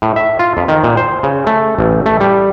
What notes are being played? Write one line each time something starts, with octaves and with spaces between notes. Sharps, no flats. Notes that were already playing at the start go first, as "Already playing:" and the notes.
A2
E5
F4
F2
D#3
A#2
C5
C#3
A3
A1
A3
G3